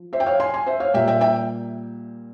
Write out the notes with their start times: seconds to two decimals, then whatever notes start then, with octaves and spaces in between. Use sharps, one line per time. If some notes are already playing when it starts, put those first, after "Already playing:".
Already playing: F3
0.13 C5 E5
0.20 G5
0.26 C#5 F5
0.40 G#5 C6
0.54 G#5 C6
0.66 C5 E5
0.80 C#5 F5
0.94 A#2 G3 A#3 E5 G5
1.08 E5 G5
1.21 E5 G5